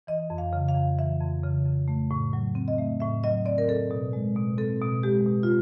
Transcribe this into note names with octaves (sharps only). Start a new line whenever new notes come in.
E3 D#5
F2
F5
C#3
F5
F2
E3 E5
F2
C#3
F2
A3
A2
F#3
C4
D#5
A3 E5
A2 E5
F#3 D#5
C4 D5
A#4
C4 A4
B2
G#3
B2
C4 A4
B2
G#3 G4
B2
F4